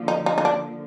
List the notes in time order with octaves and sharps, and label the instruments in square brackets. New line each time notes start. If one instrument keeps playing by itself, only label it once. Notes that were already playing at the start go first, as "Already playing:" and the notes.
Already playing: [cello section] D3 F3 A#3
[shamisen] D#4
D#4
D#4
D4